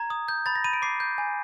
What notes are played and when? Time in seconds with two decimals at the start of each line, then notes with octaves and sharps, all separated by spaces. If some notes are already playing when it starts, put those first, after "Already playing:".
Already playing: A#5 G#6
0.10 D#6
0.28 G6
0.46 B5 A6
0.55 A#6
0.64 B5 D#7
0.73 D7
0.82 D6 C7
1.00 G6
1.18 G#5